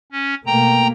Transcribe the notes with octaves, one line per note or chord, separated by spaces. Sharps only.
C#4
B2 A3 A#3 G5 A#5